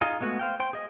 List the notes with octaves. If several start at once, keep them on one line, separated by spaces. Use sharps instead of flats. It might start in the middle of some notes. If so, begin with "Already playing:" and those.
D#4 F4 G#4 D#5
G#3 A3 B3 F#4
C5 F5 G5
C5 G5 C6
G#4 D#5